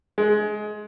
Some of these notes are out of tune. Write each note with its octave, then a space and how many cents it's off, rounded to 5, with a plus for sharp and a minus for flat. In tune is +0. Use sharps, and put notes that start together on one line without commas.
G#3 +20